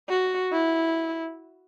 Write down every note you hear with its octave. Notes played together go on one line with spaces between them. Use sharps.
F#4
E4